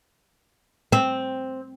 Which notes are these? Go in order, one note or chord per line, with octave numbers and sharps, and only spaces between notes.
C4